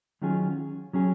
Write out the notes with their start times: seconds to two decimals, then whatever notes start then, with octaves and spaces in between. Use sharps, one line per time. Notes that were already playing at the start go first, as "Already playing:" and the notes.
0.22 D#3 F#3 C#4 F4 G#4
0.93 F#3 C#4 G#4